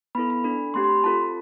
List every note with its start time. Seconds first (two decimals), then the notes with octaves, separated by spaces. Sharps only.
0.15 B3 E4 A4 B5
0.30 B5
0.44 D4 A4
0.74 A3 C4 G4 C6
0.84 C6
0.88 B5
1.04 C4 F4 A4 A5